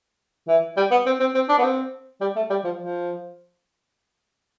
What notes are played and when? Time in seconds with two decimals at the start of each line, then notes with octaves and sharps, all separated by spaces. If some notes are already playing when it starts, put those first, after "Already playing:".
0.48 E3
0.77 G3
0.91 B3
1.06 C4
1.20 C4
1.34 C4
1.49 D4
1.58 B3
1.63 C4
2.21 G3
2.36 A3
2.50 G3
2.64 F3
2.79 F3